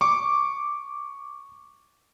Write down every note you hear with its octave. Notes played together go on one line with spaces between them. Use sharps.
C#6 D6